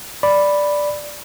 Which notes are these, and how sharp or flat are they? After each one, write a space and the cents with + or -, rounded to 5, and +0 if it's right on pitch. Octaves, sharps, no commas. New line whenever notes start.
D5 +0 B5 +0